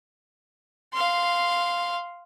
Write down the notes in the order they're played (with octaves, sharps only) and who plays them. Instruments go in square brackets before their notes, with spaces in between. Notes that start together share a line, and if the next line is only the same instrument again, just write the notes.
[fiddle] F5 C6